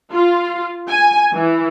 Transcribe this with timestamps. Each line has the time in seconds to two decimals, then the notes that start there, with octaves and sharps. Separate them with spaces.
0.12 F4
0.89 G#5
1.33 E3